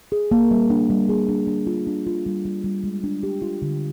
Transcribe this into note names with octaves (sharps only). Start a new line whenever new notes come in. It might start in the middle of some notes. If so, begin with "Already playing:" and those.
G#4
A#3
G3
D4
G3
G#4
D4
D4
F4
D4
F4
G3
G3
G3
G#3
D4
G4
F4
D3